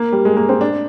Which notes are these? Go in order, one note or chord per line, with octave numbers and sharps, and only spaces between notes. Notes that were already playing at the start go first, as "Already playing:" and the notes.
Already playing: A#3
G3
G#3
A#3
C4
D4